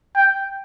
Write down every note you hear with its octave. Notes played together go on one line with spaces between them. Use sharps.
G5